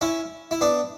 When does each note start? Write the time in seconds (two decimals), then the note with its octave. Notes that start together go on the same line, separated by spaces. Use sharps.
0.01 C#4 E4
0.51 E4
0.61 B3 D4